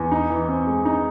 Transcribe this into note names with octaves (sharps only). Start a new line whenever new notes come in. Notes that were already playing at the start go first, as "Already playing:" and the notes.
Already playing: E2
D#4
E3
C4
G#3
D#4